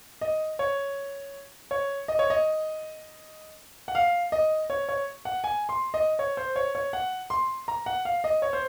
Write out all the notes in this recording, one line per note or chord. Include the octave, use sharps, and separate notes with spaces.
D#5
C#5
C#5
D#5
C#5
D#5
F#5
F5
D#5
C#5
C#5
F#5
G#5
C6
D#5
C#5
C5
C#5
C#5
F#5
C6
A#5
F#5
F5
D#5
C#5
C5